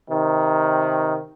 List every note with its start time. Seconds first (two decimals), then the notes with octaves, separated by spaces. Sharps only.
0.10 C3 D#3